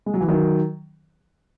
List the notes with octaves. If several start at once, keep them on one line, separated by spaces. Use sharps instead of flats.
G#3
F#3
E3
D#3 F#3